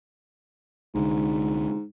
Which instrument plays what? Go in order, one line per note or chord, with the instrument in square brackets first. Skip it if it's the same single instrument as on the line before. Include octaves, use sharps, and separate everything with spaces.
[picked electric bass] C2 D3 [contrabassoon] G#2